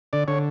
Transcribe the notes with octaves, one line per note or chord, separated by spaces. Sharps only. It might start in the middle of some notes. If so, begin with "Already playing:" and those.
D3 D5
D3 C#5